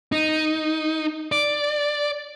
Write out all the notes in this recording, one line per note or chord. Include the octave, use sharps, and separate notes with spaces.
D#4
D5